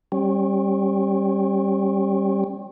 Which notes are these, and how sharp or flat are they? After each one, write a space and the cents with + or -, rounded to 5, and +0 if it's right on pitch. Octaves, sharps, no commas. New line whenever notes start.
G3 +0 C#4 -35